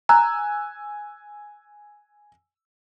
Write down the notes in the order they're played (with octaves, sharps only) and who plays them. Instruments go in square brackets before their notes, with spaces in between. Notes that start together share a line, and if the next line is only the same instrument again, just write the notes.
[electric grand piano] G#5 E6 F#6 [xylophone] A#5